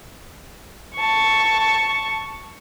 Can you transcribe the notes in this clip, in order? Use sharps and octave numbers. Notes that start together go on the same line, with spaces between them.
A5 C#6